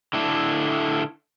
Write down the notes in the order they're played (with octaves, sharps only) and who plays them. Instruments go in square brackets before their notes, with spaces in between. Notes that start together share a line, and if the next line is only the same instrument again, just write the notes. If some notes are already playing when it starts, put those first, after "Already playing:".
[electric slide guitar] D3 A3 D4 E4